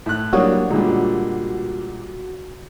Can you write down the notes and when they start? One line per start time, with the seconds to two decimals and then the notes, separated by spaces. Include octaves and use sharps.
0.06 A2 F#6
0.33 F#3 G3 A#3 D4 F#4 C#5 D#6
0.70 A#2 D3 G3 G#3